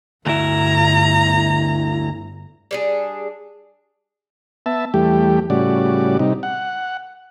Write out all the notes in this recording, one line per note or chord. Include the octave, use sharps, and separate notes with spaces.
G1 D2 E4 A#5
G3 D4 G#4
B3 E5 A5
E2 G3 A3 G4
A2 C#3 G3 F#4 D5
C3 G3 D#4
F#5